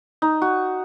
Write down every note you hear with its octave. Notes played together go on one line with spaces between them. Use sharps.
D#4
F#4